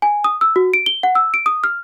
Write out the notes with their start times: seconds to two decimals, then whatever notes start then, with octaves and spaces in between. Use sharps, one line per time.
0.02 G#5
0.24 D#6
0.41 E6
0.56 F#4
0.74 D7
0.86 G7
1.03 F#5
1.15 E6
1.34 D7
1.46 D#6
1.64 F6